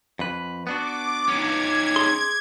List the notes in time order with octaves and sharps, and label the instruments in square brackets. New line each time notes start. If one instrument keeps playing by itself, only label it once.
[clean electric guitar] F2 B4
[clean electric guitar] B3 D4 F#4 [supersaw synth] D6
[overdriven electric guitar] C#4 D#4 [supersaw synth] G#6
[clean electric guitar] G#4 C6